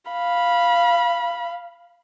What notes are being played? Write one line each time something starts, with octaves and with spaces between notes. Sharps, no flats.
F5 B5